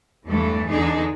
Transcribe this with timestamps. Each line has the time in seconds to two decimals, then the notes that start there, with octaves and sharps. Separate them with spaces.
0.24 E2 G2 E3 A3 A4
0.69 E2 D3 D4 D#4 G#4